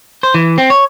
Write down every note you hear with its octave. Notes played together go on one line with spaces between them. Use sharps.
C5
E3
C4
C#5